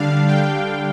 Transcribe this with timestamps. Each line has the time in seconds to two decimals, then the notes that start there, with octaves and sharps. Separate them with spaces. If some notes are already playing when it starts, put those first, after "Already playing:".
Already playing: D3 G3 D4 F5
0.28 G5